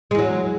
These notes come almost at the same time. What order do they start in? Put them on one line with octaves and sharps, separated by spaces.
G#3 E2 F#3